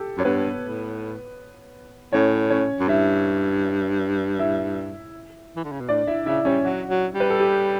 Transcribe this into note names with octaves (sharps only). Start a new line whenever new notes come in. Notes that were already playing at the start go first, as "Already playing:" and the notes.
Already playing: G4 A4
F#2 C#5
G2 B3 B4
A2
A2 C#4 C#5
C#4 C#5
F#2
G2 E4 E5
E4 E5
E3
D3
C#3
B2
A2 D4 D5
E4 E5
C#3 E4 E5
G3 C#4 C#5
F#3 F#4
F#3
G3
B4
A4
G4